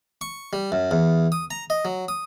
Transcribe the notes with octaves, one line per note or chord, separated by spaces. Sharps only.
C#6
G3
F#2
E2
D#6
A#5
D#5
F#3
D#6